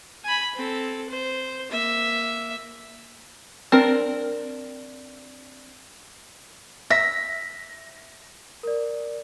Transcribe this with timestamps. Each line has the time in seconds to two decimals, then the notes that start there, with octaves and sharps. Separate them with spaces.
0.24 G#5 B5
0.55 C4 A4
1.10 C5
1.70 A#3 E5
3.72 C4 D4 A#4
6.90 E5 A#6
8.63 A#4 D5